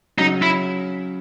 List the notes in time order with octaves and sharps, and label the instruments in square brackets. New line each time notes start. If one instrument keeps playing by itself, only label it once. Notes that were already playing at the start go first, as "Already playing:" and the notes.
[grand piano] C#3 F#3 C#4 [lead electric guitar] D#4
[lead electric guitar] E4